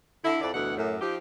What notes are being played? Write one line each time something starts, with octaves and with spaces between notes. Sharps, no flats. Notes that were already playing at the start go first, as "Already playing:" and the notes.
D3 E4
F2 E4 D5
D2 B2 E3 F#5
F#2 A2
F3 D#4 F4 G4